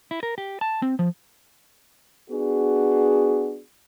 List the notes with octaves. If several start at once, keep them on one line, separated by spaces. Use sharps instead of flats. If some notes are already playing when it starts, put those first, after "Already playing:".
E4
A#4
G4
A5
C4
F3
B3 D4 F#4 G#4